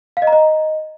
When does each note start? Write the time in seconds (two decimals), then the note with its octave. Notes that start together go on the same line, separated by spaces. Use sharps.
0.17 F5
0.22 D#5
0.27 A#5
0.33 D#5